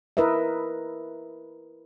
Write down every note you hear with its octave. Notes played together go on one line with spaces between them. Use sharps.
E4 A#4 B4 D#5 E5